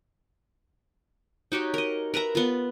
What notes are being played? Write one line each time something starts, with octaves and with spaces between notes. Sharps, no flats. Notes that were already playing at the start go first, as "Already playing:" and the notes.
D#4 F#4 G4 C#5
A#4 D#5
A#4 B4 E5 A#5
B3 F4